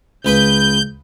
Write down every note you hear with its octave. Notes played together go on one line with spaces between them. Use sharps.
C#2 B4 B5 G6